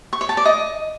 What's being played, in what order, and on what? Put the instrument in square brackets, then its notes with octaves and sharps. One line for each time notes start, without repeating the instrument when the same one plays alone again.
[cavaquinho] C#6
C#5
A5
D5
D#5